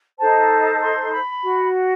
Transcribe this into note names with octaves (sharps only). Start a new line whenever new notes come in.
D#4 A4 C5 A5
C6
B5
F#4